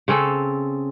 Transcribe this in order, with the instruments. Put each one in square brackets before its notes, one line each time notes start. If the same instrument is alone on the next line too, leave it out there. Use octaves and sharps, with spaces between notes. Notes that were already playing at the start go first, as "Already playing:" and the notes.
[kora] C#3 C4 C#4 A4